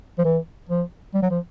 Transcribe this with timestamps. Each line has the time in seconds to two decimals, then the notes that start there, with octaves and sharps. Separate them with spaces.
0.18 F3
0.24 E3
0.69 F3
1.14 G3
1.22 F#3
1.30 F3